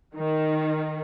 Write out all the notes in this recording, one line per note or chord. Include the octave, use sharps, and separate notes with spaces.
D#3